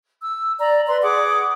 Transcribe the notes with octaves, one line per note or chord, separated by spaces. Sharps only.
E6
D5 A#5
B4 D5 C6
G#4 F#5 D6